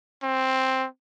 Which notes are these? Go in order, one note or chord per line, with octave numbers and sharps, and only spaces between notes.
C4